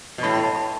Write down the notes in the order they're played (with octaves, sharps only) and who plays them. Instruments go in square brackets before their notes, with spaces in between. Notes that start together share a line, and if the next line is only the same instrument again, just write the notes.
[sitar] B2
[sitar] A2 [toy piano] B5
[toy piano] B5
A5
B5